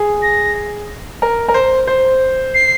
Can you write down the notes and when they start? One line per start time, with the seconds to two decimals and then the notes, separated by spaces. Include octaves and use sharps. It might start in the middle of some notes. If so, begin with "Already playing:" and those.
Already playing: G#4
0.22 A#6
1.22 A#4
1.49 A#4
1.54 C5
1.87 C5
2.54 C7